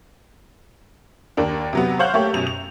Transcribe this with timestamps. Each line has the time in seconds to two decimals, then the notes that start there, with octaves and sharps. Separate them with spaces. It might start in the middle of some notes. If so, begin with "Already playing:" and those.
1.37 D#2 A#3 D4
1.73 C3 F#3 B3
1.99 C5 C#5 F5 F#5 G6 F#7
2.14 A3 A#3 G4 C#5
2.33 F#2 B2 F7
2.47 F7